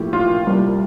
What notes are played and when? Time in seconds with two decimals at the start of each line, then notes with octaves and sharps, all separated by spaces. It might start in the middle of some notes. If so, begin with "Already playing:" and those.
Already playing: A#1 A2 F3 G4
0.13 F4
0.47 C2 A#2 G3